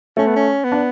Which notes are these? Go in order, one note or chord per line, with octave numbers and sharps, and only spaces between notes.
A3 C#4
B3
C#4
B3
D4